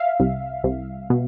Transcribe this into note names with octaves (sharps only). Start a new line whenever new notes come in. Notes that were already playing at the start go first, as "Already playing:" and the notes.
Already playing: E5 F5
C2
C2
B2